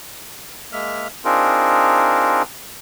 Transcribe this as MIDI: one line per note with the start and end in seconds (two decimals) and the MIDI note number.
0.73 1.08 56
0.73 1.08 58
0.73 1.08 76
0.73 1.08 89
1.25 2.42 60
1.25 2.42 62
1.25 2.42 63
1.25 2.42 65
1.25 2.42 68
1.25 2.42 70